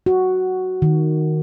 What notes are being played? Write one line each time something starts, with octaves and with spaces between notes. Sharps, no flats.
F#4
D#3